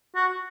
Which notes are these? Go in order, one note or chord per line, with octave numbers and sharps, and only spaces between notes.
F#4